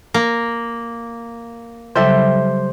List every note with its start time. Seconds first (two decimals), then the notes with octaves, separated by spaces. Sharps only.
0.14 A#3
1.96 C#3 F#3 G3 G4 A4 C5 E5